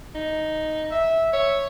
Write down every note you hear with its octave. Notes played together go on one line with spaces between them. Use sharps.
D#4
E5
C#5 E5